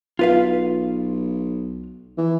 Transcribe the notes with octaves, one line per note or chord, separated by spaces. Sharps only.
B1 F4 B4 F5
E3